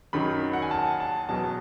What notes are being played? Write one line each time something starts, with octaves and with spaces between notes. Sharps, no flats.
F#2 D#3 F#3 B5
F#5
G#5
A5
A5
E2 B2 F#3 A5